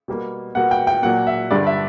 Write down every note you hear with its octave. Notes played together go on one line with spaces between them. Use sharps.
B2 G3 A#3
B2 G3 A#3 F#5
G5
G5
A#2 F#3 A#3 F#5
E5
G2 D3 G3 D5
E5